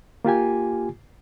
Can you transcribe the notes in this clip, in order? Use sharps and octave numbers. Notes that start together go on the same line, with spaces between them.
A#3 F4 G4 G#5